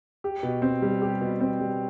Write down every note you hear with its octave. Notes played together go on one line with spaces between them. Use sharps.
G4
B2
C4
G3
G4
B2
C4
G3